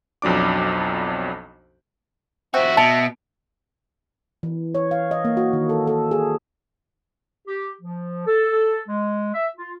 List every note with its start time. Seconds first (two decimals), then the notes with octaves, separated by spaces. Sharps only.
0.22 B1 F2 F#3 D4 D6
2.54 F2 C4 F#4 E5
2.77 B2 A5
4.43 E3
4.75 C#5
4.91 F5
5.11 D#5
5.25 A#3
5.37 F#4
5.53 D#3
5.69 A4
5.87 A4
6.11 G#4
7.48 G4
7.82 F3
8.27 A4
8.88 G#3
9.33 E5
9.56 F4